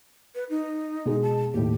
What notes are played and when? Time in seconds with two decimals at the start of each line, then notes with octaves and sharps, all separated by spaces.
0.35 B4
0.50 D#4
1.05 B2 G#3
1.22 A5
1.54 D#2 A2 G4